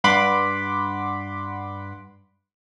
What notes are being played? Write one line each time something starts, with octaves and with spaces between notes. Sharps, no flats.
G2 F#5 B5 C6 D6